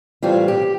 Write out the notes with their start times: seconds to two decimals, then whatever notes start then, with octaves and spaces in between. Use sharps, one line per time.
0.23 A2 E3 G3 C4 F4
0.48 G4